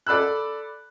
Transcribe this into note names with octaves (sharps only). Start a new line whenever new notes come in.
A4 D5 B5 E6 F#6